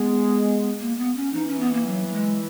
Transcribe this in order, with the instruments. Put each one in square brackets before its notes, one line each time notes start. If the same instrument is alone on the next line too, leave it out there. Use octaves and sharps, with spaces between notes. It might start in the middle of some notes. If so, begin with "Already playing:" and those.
Already playing: [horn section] G#3 [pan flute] B3
[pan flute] A#3
B3
C#4
[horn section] E3 [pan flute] D#4
[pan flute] C#4
B3
A#3
F#3
F#3
G#3